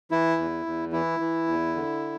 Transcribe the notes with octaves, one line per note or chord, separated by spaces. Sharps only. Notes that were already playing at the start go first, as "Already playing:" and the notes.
E3 E4
E2
E2
E3 E4
E3
E2
D3